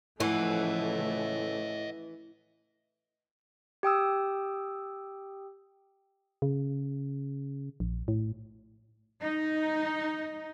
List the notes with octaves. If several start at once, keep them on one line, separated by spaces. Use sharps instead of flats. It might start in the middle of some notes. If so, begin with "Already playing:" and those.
A2 C#3 E3 F3 A3 D#5 F#5
G4 G5 D#6 E6
C#3
A#1
A2
D#4